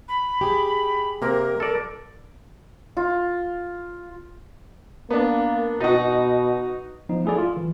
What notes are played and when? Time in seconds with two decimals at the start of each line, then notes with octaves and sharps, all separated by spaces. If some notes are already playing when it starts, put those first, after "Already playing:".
0.08 B5
0.41 G4 G#4
1.22 C3 A#3 A#4
1.60 A4 D5
2.97 F4
5.10 A#3 B3 D4
5.80 B2 D#4 F#4
7.09 F3 B3 D#4
7.25 A3 E4 G#4 A4 D5
7.38 F4
7.57 E3